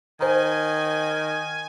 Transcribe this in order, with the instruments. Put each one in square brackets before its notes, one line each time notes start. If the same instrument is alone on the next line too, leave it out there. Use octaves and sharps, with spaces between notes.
[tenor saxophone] D#3 [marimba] C5 A#5 [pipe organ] G#5